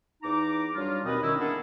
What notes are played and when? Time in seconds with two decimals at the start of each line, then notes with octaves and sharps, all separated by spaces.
0.23 E2 D#4 A#5 D6
0.74 F#3 G3 D4 F4
1.04 D#2 B2 C4 B4 D#5
1.24 D#3 C#4 E4
1.39 A#3 B3 D4 E4 G#4 A4